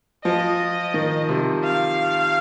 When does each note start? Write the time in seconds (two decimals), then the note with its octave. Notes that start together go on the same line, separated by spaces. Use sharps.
0.24 F3 D#5
0.94 D#3
1.29 C3
1.64 F5